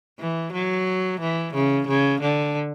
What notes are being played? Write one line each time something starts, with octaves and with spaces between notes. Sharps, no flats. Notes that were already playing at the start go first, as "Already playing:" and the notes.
E3
F#3
E3
C#3
C#3
D3